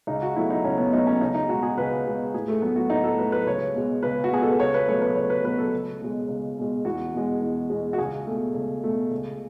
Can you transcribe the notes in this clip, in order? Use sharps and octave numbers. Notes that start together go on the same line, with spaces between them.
C#2 D#4
F#4
B2 F#3 A3 E4
D#4
C#2 C#4
B3
B2 F#3 A3 D#4
C#4
C#2 D#4
D#4
B2 G#3 F#4
G#4
C#2 B4
B2 G#3
A2 G#4
A3
F#3 A3 B3
F#4
A2 D#4
A4
F#3 A3 B4
B4
C#2 C#5
B2 G#3
C#2 B4
F#4
B2 G#3 G#4
A4
B4
C#2 C#5
B4
B2 F#3 A3 C#5
B4
C#2 C#5
B4
B2 F#3 A3 B4
A4
C#2
B2 G#3
C#2
B2 G#3
E2 F#4
B2 G#3
E2
B2 G#3
F#4
C#2 G#4
B2 A3
C#2
B2 A3
C#2